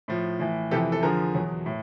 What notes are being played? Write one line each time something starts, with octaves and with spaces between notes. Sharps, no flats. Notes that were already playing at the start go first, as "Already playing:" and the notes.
A2 F3
A2 E3
F2 C3 E3 G4 A4
A4
F2 D3 F3 G#4 A#4
E2 B2 F#3
A2